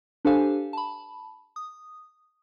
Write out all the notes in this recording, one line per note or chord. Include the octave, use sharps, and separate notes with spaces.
D4 G4 A4 C5 F5 G#5
A5 B5
D#6